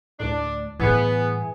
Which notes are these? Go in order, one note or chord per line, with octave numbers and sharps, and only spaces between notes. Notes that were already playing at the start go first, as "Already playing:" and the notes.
D2 A2 D4
A2 E3 G3 B3 G#4